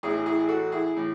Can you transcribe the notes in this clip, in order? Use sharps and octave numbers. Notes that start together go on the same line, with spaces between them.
A1 A2 E3 E4 G#4
E4 G#4
F#4 A4
E4 G#4
A2 E3